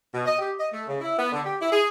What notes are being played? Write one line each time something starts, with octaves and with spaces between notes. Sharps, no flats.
B2
D#5
G4
D#5
A3
C#3
E4
B3
D3
G4
E4
G#4